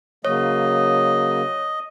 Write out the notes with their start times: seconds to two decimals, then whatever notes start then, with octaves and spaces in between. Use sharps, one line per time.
0.25 C#3 F#3 A#3 C#5 D#5